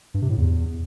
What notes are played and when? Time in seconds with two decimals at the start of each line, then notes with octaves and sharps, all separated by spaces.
0.14 G2
0.22 C3
0.30 A2
0.38 E2